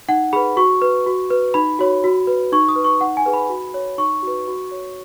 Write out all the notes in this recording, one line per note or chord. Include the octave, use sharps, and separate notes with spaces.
D#4 F#5
G#4 B4 B5
F#4 C#6
B4
F#4
B4
D#4 B5
F#4 C#5
F#4
B4
D#4 C#6
D#6
B4
C#6
D#4 F#5
G#5
G#4 B4
B5
F#4
C#5
D#4 C#6
F#4 B4
F#4
C#5